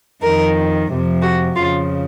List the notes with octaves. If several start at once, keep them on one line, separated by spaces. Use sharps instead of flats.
F2 D#3 A#4
F2 C3 F3
F#4
F2 C#3 F3 F4